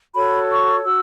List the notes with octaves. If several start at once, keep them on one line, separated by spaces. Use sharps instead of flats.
F#4 A4 C#5 B5
C#6
F#4 E6